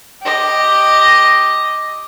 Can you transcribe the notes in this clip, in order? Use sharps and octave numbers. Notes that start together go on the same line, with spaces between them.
G4 D#5